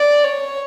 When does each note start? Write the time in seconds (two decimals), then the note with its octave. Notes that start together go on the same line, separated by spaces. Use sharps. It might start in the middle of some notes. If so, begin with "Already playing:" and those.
Already playing: D5
0.25 C#5